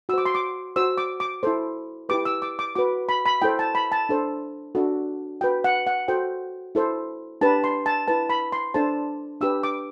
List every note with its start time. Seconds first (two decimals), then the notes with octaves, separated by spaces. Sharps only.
0.09 F#4 E6
0.13 C5 D6
0.25 C6
0.35 D6
0.76 F#4 C5 E6
0.98 D6
1.20 D6
1.43 E4 A4 C5
2.09 E4 G4 B4 D6
2.25 E6
2.42 D6
2.59 D6
2.75 F#4 B4 D6
3.09 B5
3.26 B5
3.42 E4 A4 C5 G5
3.59 A5
3.75 B5
3.92 A5
4.09 D4 A4 C5
4.75 D4 F#4 A4
5.41 F#4 B4 G5
5.64 F#5
5.87 F#5
6.08 F#4 A4 C5 G5
6.75 E4 A4 C5
7.41 D4 G4 B4 A5
7.64 C6
7.86 A5
8.08 E4 B4 A5
8.29 B5
8.52 C6
8.74 D4 A4 C5 A5
9.41 D4 G4 B4 E6
9.63 D6